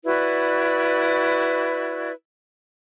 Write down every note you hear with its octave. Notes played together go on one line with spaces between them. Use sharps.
E4 F#4 B4 D5